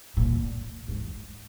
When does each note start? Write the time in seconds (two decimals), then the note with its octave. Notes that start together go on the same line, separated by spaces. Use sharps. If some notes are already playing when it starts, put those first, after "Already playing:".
0.17 A#2
0.88 G#2